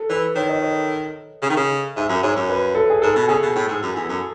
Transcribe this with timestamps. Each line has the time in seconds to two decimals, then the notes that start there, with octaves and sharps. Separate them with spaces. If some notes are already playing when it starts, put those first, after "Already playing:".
Already playing: A4
0.09 E3 B4
0.35 D#3 C#5
0.49 D#5
0.62 C#5
1.42 C#3
1.50 D#3
1.57 C#3
1.96 G#2 E5
2.09 F#2
2.23 G#2 C#5
2.36 F#2
2.49 B4
2.75 A4
2.90 G#4
3.02 G#2 A4
3.16 B2
3.28 C#3 G#4
3.42 B2
3.55 A2
3.68 G#2
3.82 F#2
3.96 E2
4.09 F#2